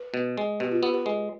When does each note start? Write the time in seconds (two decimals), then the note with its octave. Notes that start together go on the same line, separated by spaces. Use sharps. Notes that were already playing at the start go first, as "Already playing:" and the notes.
Already playing: B4
0.14 B2
0.38 G#3
0.60 B2 G4
0.71 F4
0.83 B3 G4
0.94 B4
1.06 G#3